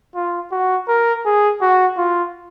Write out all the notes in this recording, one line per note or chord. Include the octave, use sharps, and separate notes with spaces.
F4
F#4
A#4
G#4
F#4
F4